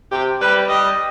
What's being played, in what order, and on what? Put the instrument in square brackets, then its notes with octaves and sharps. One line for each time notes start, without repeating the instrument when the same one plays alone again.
[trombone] C3 [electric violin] G4
[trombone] G3 [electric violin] B4
[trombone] G3 [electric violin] D#5